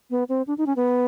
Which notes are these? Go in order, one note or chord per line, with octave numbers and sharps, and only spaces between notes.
B3
C4
D4
D#4
C#4
B3